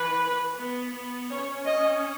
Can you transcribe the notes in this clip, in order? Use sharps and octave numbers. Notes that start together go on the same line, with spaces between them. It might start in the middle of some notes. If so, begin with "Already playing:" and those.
Already playing: E3 B4
B3
B3
C#4 C#5
D#5